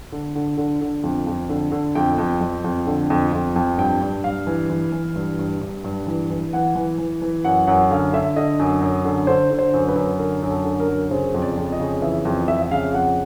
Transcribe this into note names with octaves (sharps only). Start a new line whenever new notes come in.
D3
D3
D3
D3
F2
F2
D3
D3
F2 G5
F2
F2
F2
D3
F2
F2
F2
G2 G5
G2
G2 F5
E3
E3
E3
G2
G2
G2
G2
E3
E3
E3 F#5
E3
E3
E3
F#2 F#5
F#2 F#5
D3 F5
D3 E5
D3 D#5
F#2
F#2
D3
D3 C5
D3
C5
F#2
B4
F#2
D3 A#4
F#2
A4
D3
A#4
F#2
C#3 C5
F2
D5
F2
D#5
C#3
E3 E5
F2
F2 E5
E5
C#3 F5
F2 F#5